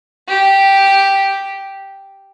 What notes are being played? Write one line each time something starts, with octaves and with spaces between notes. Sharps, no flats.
G4